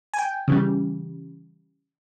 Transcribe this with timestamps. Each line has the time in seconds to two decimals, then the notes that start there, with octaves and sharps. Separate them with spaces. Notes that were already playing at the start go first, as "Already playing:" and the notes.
0.14 G#5
0.19 G5
0.48 C#3 E3 G3